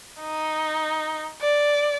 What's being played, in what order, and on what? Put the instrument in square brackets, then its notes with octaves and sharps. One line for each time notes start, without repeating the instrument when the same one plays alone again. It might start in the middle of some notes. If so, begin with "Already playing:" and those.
[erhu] D#4
D5